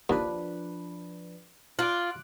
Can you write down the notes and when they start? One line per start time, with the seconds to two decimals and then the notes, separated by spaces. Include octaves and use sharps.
0.10 D#2 F3 D4 B4
1.79 F4 D6 F#6